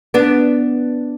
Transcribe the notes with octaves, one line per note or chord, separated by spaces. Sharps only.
B3 D4